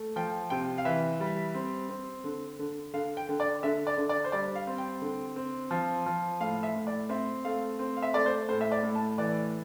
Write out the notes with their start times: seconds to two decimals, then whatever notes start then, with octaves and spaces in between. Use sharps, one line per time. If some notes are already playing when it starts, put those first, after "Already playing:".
Already playing: A3
0.16 F3 G5
0.50 C3 G5
0.78 F5
0.85 E3 E5
1.20 G3
1.54 C4
1.89 C4
2.24 D3
2.59 D3
2.94 D3 F5
3.17 G5
3.29 D3
3.40 D5
3.63 D3 E5
3.87 D5
3.98 D3
4.09 D5
4.24 C5
4.32 G3 D5
4.55 F5
4.67 C4
4.78 G5
5.02 D3
5.36 C4
5.71 F3
6.06 F3
6.41 A2 F5
6.63 E5
6.76 A2
6.87 D5
7.09 C4 E5
7.45 A3 F5
7.79 C4
7.97 F5
8.03 E5
8.14 A3 D5
8.26 C5
8.49 A2 C5
8.61 E5
8.72 D5
8.83 A2
8.95 A5
9.18 E3 D5